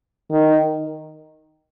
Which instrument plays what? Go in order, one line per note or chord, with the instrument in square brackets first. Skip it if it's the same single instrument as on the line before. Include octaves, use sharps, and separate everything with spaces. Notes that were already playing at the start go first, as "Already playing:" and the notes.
[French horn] D#3